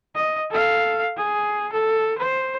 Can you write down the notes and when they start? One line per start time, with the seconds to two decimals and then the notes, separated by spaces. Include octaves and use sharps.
0.15 D#5
0.51 A4 F5
1.17 G#4
1.72 A4
2.18 C5